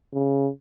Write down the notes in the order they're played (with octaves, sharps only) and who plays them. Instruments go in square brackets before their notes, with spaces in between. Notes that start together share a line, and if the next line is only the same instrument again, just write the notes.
[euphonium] C#3